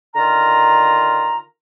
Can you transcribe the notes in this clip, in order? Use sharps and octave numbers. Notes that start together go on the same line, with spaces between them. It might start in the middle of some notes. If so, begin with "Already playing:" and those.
D3 D#3 F4 A#5